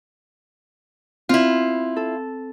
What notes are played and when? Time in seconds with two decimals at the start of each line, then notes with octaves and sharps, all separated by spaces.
1.29 C4 E4 F4
1.96 A4